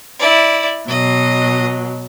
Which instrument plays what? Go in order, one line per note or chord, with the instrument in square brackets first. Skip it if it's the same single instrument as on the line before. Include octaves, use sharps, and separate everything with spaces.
[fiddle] E4 D5
[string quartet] B2 F#3 [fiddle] D#5